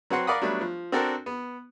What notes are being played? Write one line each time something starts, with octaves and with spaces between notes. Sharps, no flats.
F#3 C4 B4 F#5 C6
A#4 D5 F5 F#5 B5 D#6
F#3 G3 A3 B3 D4
F3
C4 D4 F#4 A4 A#4
B3